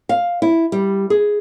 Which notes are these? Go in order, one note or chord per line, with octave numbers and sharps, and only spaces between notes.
F5
E4
G3
G#4